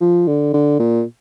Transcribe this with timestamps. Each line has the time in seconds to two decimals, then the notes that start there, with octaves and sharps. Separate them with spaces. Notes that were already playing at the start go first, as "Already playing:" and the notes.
0.01 F3
0.27 D3
0.53 D3
0.79 A#2